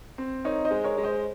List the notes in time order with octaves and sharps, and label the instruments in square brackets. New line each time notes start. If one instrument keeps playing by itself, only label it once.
[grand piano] C4
[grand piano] D#4 [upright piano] A#4 C#5
[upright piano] C5 D#5
[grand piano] G#3
[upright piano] A#4 C#5
[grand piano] G#3
[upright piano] C5 D#5